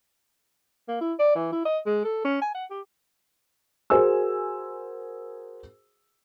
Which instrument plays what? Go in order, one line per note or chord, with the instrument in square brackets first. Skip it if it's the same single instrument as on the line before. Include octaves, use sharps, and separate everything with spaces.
[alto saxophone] A#3
E4
D5
E3
E4
D#5
G#3
A4
C#4
G#5
F#5
G4
[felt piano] F#4 G#4 A#4 C5 G#5 E6